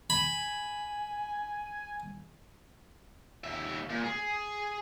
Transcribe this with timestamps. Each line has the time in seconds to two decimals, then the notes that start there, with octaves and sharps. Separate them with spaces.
0.10 G#5 B5
3.44 D#2 E5
3.90 A#2
4.04 G#4